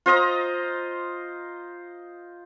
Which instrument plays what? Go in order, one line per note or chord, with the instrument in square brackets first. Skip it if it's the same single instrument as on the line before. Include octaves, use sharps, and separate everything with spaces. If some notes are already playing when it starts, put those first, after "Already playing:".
[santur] F4 C5 D#5 A#5